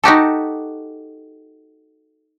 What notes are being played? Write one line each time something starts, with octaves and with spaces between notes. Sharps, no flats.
D#4 F#4 G4 A4